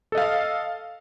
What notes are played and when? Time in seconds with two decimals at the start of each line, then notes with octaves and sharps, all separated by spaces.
0.12 A4
0.15 D#5
0.18 F5